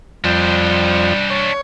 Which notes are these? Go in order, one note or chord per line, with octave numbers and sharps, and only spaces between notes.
F2 G3 D4 C5
C#5